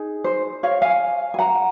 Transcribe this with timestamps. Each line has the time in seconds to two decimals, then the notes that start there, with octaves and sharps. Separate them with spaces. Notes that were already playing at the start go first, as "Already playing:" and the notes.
Already playing: D#4 G#4
0.24 C5
0.63 C#5 F5
0.82 F5 G#5
1.34 G#5
1.39 F#5 A#5